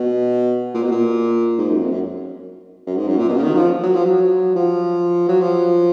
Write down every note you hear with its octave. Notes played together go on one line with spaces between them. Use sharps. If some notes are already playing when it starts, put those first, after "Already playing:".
Already playing: B2
A#2
B2
A#2
G#2
F#2
F2
F#2
F#2
G#2
F#2
A#2
B2
C#3
D#3
F#3
F3
F#3
F3
F#3
F3
F#3
F3